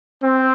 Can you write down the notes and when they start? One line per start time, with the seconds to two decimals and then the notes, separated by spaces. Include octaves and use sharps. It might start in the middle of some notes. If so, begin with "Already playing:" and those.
0.23 C4